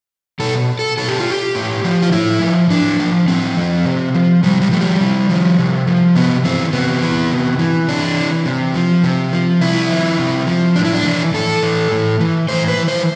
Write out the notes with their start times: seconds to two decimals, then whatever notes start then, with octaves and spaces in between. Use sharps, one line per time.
0.40 B2 A4
0.79 A4
0.98 B2 A4
1.08 G4
1.20 F4
1.30 G4
1.55 A2
1.84 F3
2.02 F4
2.12 A2 E4
2.42 F3
2.70 A2 D4
2.99 F3
3.28 A2 C4
3.57 F3
3.85 C3
4.14 F3
4.43 C3 G3
4.62 G3
4.71 F3 A3
4.81 G3
5.01 C3
5.30 F3
5.59 C3
5.86 F3
6.16 C3 B3
6.44 E3 C4
6.73 C3 B3
7.03 E3
7.31 C3
7.59 E3
7.88 C3 D4
8.17 E3
8.46 C3
8.74 F3
9.04 C3
9.33 F3
9.61 C3 E4
9.89 F3
10.19 C3
10.47 F3
10.76 A2 D4
10.85 E4
10.93 D4
11.05 E3
11.34 A2 A4
11.63 E3
11.92 A2
12.20 E3
12.48 A2 C5
12.68 B4
12.77 E3
12.88 C5